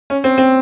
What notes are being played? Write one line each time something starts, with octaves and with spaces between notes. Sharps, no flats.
C#4
C4
C4